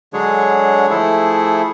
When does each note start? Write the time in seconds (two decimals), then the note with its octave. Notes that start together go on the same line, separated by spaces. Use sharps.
0.13 D3 F#3 G#3 D4 G#4 C#5
0.90 F3 A3 E4 G#4 A4